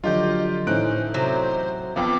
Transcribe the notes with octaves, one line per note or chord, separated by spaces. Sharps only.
D3 F3 F#3 F4 G4 D#5 G6
A2 E3 C#4 D#4 C5 F#6 D7
C3 F#3 C5
F2 F3 B3 F5 G5 D6